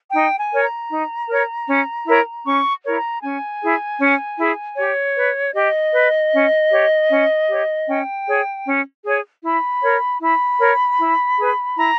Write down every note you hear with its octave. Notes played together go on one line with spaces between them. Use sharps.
D#4 G5
G#5
A#4 C#5
A#5
D#4
A#4 C#5
C#4
E4 A#4 C#5
C#4 C#6
E4 A#4 C#5
A#5
C#4 G#5
E4 G#4
C#4
E4 G#4
G4 C#5
B4
G4 D#5
B4
C#4
G4 C#5
C#4
G4 C#5
C#4 G5
G#4 C#5
C#4
G#4 C#5
E4 B5
A#4 C#5
E4 B5
A#4 C#5
E4
G#4 B4
E4 A#5